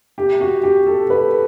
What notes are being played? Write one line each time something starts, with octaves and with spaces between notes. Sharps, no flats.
G4
F#4
G4
A4
B4